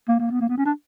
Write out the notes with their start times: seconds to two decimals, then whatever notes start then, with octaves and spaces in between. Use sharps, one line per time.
0.09 A#3
0.20 A#3
0.31 B3
0.41 A#3
0.49 B3
0.58 C#4
0.65 D4